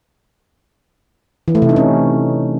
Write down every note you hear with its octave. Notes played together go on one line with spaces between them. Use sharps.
E3
A3
C3
D#4
C#4